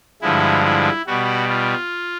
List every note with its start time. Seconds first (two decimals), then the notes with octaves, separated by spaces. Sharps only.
0.22 G2 D3 F3 G#3 E4
0.64 E4
1.06 B2 G3 F#4
1.49 F4